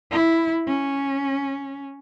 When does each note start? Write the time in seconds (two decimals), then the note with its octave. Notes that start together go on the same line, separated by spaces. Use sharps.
0.11 E4
0.67 C#4